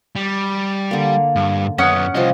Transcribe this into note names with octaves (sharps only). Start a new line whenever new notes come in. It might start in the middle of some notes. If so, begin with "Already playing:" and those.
G3
D3 A#3
G2
F#2 B3 C#4 F#5 D#6
C2 F3 G3 G4 D#5